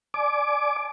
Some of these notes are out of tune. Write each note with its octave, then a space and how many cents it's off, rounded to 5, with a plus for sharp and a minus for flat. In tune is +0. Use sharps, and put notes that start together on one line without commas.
D5 +0 G#5 +40 D6 +0